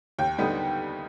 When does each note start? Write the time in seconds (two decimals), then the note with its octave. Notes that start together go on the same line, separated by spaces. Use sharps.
0.18 D#2 G5
0.39 D3 G3 B3 D#4